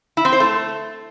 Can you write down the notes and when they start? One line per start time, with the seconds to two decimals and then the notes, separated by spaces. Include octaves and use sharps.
0.17 E4
0.25 C4
0.32 C5
0.40 A3